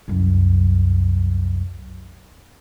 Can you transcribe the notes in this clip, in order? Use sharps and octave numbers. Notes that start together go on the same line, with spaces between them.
C2 F#2